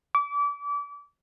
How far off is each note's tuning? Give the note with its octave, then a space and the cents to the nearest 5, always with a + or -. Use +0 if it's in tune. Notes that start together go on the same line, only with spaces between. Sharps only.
D6 -30